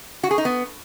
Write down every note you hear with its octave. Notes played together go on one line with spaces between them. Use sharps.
F#4
G#4
D#4
B3